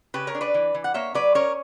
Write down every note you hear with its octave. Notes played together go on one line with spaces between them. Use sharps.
C#3 G4 B4
A#4 C#5
D4
B4 D5
E3
E3
F#5
A#3 C#5 E5
F#3 B4 D5
C#4 A#4 C#5